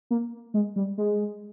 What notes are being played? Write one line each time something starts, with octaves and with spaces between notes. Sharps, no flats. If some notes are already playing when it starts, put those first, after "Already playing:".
A#3
G#3
G3
G#3